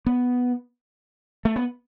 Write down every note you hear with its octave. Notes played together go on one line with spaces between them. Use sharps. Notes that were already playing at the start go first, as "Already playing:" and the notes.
B3
A3
B3